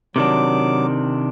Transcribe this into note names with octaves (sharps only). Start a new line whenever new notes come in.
C3 D#3 F#3 D4 D6